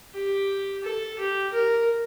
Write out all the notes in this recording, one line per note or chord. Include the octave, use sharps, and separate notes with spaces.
G4
A4
G4
A#4